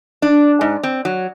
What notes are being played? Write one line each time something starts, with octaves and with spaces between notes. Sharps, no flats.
D4
G#2
C4
F#3